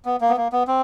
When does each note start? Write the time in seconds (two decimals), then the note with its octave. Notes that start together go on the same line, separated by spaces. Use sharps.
0.06 B3
0.21 A#3
0.29 B3
0.37 A#3
0.52 B3
0.68 C4